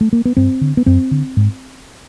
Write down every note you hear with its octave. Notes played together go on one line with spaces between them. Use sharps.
A3
A#3
B3
G2 C4
D3
B3
F#2 C4
D3
G#2